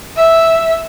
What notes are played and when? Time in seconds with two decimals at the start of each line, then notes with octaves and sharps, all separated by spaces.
0.16 E5